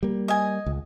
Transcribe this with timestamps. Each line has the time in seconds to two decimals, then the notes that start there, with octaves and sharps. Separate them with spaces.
0.03 G3 A#3
0.28 D#5 G#5
0.66 C#2